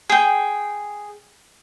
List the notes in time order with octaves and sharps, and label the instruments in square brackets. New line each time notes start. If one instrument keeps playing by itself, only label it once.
[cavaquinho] G#4 G5